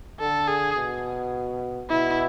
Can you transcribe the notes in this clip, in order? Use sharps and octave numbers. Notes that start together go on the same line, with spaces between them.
D3 A4
G#4
B2
B2 E4